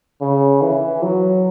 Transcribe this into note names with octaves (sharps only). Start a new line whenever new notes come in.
C#3
E3
F#3